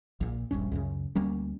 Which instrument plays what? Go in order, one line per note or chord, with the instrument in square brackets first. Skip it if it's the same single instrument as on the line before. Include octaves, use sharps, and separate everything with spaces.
[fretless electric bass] A#1 A#2
D#1 A#1 G2 C#4
C#2 F#2 C#3
D2 G3 A#3 C#4